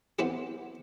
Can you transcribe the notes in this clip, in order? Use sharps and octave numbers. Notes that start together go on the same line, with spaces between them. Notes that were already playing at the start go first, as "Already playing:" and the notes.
B3 C4 E4 G4